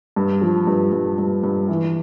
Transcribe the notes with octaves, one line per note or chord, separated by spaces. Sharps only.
G2
F3
G2
G2
G2
G2
E3